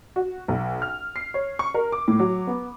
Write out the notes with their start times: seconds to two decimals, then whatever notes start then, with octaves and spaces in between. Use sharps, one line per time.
0.16 F#4
0.48 B1
0.82 F6
1.16 C7
1.34 C#5
1.59 C#6
1.74 A#4
1.92 D6
2.08 A2
2.19 F#3
2.47 B3